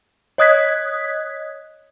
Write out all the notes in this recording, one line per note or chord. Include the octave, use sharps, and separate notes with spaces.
C#5 D#5 D#6 F#6 G#6 B6